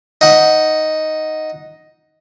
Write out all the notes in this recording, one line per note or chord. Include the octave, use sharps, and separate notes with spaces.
D#4 F#5